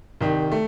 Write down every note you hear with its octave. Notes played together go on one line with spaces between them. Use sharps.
C2 C3 D#3
A3